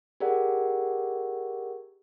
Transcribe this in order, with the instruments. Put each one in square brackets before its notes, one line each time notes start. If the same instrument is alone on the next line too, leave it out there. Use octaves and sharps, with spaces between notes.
[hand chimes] G4 G#4 A#4 D5 F#5